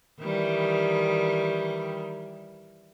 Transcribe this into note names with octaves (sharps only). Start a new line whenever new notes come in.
D#3 E3 G3